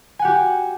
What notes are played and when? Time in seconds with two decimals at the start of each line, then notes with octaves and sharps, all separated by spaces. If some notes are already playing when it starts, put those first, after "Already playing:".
0.19 G#5
0.22 F#5
0.25 G4
0.27 F#4